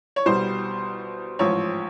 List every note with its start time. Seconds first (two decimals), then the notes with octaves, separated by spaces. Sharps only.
0.16 C#5
0.26 C2 B2 G3 C5
1.39 A1 G#2 F3 C#5